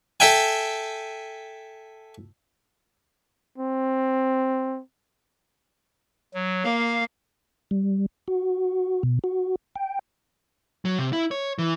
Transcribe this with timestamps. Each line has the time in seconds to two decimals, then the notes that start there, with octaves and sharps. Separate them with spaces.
0.20 A4 E5 G5 G#5
3.58 C4
6.34 F#3
6.64 A#3 F5
7.71 G3
8.28 F#4
9.03 B2
9.24 F#4
9.76 G5
10.85 F#3
10.98 C3
11.13 E4
11.31 C#5
11.59 E3